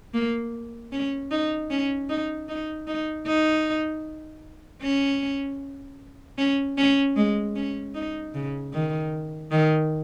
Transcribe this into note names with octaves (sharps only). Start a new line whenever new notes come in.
A#3
C#4
D#4
C#4
D#4
D#4
D#4
D#4
C#4
C#4
C#4
G#3
C#4
D#4
C#3
D#3
D#3